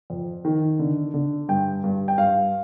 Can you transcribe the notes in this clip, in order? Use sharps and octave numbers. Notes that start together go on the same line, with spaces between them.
F2
D#3
D3
D3
G2 G5
G2
G5
G2 F5